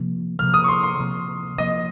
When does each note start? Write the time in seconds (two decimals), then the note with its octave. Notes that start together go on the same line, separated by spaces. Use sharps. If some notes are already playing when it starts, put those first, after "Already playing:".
Already playing: C3 F3 A#3
0.39 C3 F3 A#3 F6
0.54 D#6
0.64 C#6
0.68 C6
0.83 C6
0.99 C3 F3 A#3
1.58 C3 F3 A#3 D#5